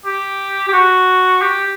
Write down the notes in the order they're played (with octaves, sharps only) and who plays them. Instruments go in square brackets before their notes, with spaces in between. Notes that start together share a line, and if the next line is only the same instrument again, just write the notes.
[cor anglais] G4
G4
F#4
G4